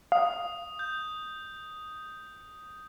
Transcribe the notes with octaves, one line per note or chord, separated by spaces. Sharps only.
F5 D#6
G6